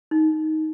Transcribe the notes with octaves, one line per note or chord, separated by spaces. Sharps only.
D#4